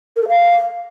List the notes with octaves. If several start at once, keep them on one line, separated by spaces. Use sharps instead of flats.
A#4
A4
F5